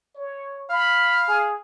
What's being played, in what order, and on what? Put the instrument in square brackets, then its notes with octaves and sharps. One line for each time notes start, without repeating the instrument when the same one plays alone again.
[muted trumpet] C#5
[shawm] F5 [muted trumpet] B5
[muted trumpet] G#4